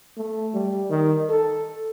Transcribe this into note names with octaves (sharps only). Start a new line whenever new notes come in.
A3
G3
D#3
A4